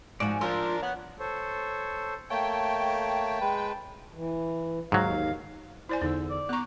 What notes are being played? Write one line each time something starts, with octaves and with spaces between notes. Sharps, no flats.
G#2 F3 F#4 D5
F3 D4 F4 A#4 C6 E6
B3 C#5 F#5
A4 C5 C#5
A3 A#3 C#5 G5 A5
G#3 B4
E3
D#2 G#2 F#3 F5
E4 C5 D5 G#5
E2 D3 D#4 E6
D5
B3 A#5 C#6 D6 F#6